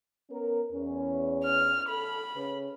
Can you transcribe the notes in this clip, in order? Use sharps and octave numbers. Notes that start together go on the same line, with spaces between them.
B3 C#4 A#4
E2 C#4
F6
A4 B5
C#3 C#4 B4